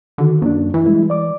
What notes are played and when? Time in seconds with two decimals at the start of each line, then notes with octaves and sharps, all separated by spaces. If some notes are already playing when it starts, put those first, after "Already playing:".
0.18 D3 D#3 F#4
0.42 F#2 A#3 D4
0.74 E3 E4
0.86 G3 G#3 E4
1.10 D5 D6